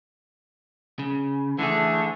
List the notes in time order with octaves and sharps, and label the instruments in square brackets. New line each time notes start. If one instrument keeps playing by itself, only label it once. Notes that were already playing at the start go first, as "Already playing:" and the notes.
[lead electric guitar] C#3
[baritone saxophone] D3 [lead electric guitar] E3 G#4 [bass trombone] A3